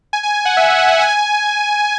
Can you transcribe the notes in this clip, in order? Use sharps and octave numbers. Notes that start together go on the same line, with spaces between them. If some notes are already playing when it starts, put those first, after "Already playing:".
G#5
G#5
F#5
E5
F#5
G#5